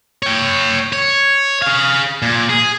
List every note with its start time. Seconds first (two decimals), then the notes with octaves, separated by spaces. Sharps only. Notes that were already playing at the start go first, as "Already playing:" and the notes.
0.23 C#5 G5
0.93 C#5
1.62 G#4 F5
2.22 A#2
2.50 G#4